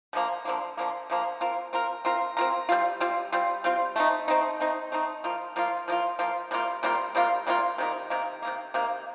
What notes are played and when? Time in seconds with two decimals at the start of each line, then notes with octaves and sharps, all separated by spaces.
0.13 D3 F3 A#3
0.45 D3 F3 A#3
0.77 D3 F3 A#3
1.10 D3 F3 A#3
1.41 C4 F4 A#4
1.73 C4 F4 A#4
2.05 C4 F4 A#4
2.37 C4 F4 A#4
2.69 G3 C4 F4
3.00 G3 C4 F4
3.32 G3 C4 F4
3.64 G3 C4 F4
3.96 A3 C4 D#4
4.28 A3 C4 D#4
4.60 A3 C4 D#4
4.92 A3 C4 D#4
5.24 F3 A#3 F4
5.56 F3 A#3 F4
5.88 F3 A#3 F4
6.19 F3 A#3 F4
6.51 C3 G3 A#3 F4
6.83 C3 G3 A#3 F4
7.15 C3 G3 A#3 F4
7.47 C3 G3 A#3 F4
7.78 C3 D#3 A#3
8.10 C3 D#3 A#3
8.42 C3 D#3 A#3
8.74 C3 D#3 A#3